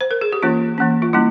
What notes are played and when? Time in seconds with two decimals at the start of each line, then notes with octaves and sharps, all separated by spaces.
0.01 C5
0.11 A#4
0.21 G#4
0.32 G4
0.42 E3 A#3 C#4 F4
0.78 E3 A#3 C#4
1.02 F4
1.13 G3 A#3 C#4 E4